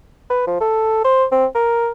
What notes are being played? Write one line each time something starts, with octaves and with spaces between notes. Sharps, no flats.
B4
F3
A4
C5
C4
A#4